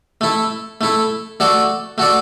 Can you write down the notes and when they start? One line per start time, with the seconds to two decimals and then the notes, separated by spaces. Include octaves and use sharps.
0.21 A3 E4 A4
0.81 A3 E4 A4
1.40 A3 F#4 A4 D5
1.98 A3 F#4 A4 D5